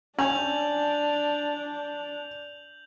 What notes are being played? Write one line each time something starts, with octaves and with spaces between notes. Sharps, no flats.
C#4 D4 G#5 G6 F7 F#7